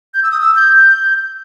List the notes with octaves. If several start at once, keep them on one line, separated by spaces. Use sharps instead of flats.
G6
E6
D#6
E6
G6